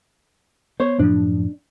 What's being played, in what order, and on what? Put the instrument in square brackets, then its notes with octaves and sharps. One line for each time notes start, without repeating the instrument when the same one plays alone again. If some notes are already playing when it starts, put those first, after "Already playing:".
[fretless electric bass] B3 [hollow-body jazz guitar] C5 C#5
[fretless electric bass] F#2 A2 F3 [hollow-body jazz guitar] D4